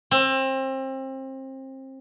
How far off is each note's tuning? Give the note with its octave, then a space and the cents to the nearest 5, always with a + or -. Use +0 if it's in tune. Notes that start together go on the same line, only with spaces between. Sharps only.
C4 +30